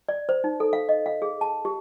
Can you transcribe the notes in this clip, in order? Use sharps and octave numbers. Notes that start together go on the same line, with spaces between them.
D5
C5
D#4
A4
F5
D#5
F5
G#4
A5
G4